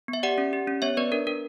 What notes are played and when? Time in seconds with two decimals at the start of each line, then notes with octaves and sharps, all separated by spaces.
0.08 B3
0.13 E5
0.23 G4 D5 F#5
0.38 C#4
0.53 G4
0.67 C#4
0.82 B3 C#5 E5
0.97 B3 B4 D5
1.12 D4 A#4
1.27 D4 A#4